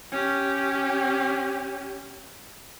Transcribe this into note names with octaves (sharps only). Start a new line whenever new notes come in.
C#4 G4